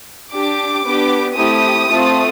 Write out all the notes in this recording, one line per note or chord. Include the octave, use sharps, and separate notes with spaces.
D4 G4 D6
B3 D4 G4
A3 C4 E4 G4 D#6
A3 C4 F4 A4